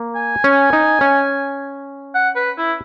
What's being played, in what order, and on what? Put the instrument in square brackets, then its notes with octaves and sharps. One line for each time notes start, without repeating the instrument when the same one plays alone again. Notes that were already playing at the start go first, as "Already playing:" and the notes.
Already playing: [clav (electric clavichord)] A#3
[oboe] G#5
[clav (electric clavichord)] C#4
D#4
C#4
[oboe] F#5
B4
E4